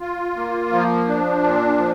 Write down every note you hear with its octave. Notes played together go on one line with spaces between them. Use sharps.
F4
A#3
F3
D4
A#2
F3